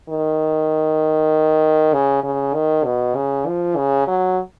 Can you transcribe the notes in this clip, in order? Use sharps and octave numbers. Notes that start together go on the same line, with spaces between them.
D#3
C#3
C#3
D#3
B2
C#3
F3
C#3
F#3